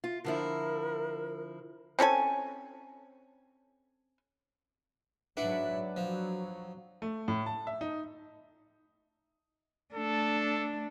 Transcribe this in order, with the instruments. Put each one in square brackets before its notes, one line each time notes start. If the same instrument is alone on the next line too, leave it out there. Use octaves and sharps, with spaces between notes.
[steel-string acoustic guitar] F4
[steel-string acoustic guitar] D3 F3 E4 [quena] A#4
[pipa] C4 C#4 A4 G#5
[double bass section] G#2 F#3 [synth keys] D4 B4 F#5 [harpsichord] E4
[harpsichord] F3 [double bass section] F#3
[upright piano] A3
A2
A5
E5
D#4
[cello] A3 D4 [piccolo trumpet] A4